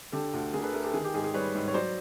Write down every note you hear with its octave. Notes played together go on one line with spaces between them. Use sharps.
D3 G4 A4
D2
D3 G#4 A#4
A4 B4
A3 G#4 A#4
G4 A4
D#3 G#4
G4
G#2 G#4
G#4
G3 B4 C#5
G#2
C#5
F#3 C5 D5